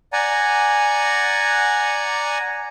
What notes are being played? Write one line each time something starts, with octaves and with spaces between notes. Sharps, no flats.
D5 F#5 G#5 A#5